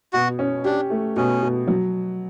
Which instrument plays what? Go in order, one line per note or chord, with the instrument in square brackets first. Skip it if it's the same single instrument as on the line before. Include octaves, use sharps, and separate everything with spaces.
[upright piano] B2 [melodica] F#4
[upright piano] C#4
[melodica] D4 [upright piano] G4
[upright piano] A3
[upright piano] B2 [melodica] C#4
[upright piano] B2
F#3